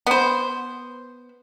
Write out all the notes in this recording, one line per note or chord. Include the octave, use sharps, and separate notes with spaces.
B3 C5